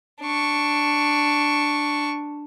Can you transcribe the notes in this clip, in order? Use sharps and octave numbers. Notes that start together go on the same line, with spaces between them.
D4 C#6